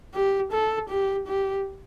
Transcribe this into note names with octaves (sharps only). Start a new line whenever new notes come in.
G4
A4
G4
G4